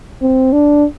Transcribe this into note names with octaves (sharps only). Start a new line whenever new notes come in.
C4
D4